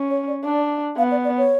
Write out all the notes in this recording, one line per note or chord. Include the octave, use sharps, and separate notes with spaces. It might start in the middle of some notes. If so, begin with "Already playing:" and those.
Already playing: C#4
C#5
D5
D4 D5
B3 F5
D5
D5
C#5